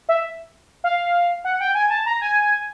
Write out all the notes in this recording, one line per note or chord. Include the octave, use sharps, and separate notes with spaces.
E5
F5
F#5
G5
G#5
A5
A#5
G#5